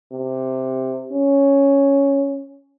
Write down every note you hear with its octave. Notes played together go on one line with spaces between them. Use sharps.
C3
C#4